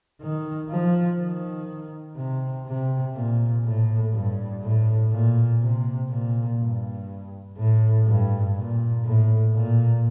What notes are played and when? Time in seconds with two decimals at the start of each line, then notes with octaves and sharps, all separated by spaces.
0.21 D#3
0.69 F3
1.19 D#3
2.17 C3
2.67 C3
3.15 A#2
3.65 A2
4.14 G2
4.63 A2
5.12 A#2
5.61 C3
6.10 A#2
6.59 G2
7.57 A2
8.07 G2
8.56 A#2
9.05 A2
9.54 A#2